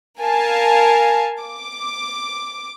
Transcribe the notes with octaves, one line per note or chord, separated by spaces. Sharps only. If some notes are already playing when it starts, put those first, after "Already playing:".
A#4 F5 G#5 A5
D6